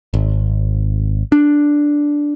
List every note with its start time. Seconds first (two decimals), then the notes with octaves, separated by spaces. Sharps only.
0.14 G#1
1.32 D4